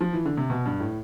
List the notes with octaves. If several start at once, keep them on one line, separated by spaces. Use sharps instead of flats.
F3
E3
D3
C3
B2
G2
A2